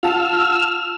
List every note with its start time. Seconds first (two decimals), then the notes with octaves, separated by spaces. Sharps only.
0.03 F4 F#5 A5 E6 F6